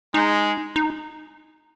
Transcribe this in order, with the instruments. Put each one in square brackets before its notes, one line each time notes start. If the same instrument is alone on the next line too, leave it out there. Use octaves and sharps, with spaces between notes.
[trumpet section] G#3 [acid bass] D#4
[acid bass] D#4